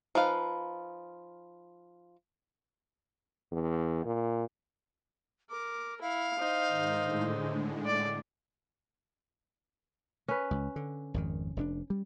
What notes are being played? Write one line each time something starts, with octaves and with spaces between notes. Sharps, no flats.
F3 D#4 B4 F5
E2
A#2
A#4 D6
E4 F5
D#4 C5
G#2 D#3
A2 D3 G#3
D5 D6
C#4 B4
C#2
D3
G#1 F2 D#3
F1 C3 D4
G3